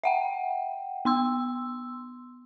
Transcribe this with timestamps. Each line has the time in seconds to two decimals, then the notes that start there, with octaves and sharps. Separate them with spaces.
0.04 E5 F#5 G5
1.05 B3 C6 E6